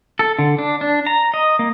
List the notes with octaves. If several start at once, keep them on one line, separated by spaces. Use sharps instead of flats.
A4
D3
D4
D4
A#5
D#5
A#3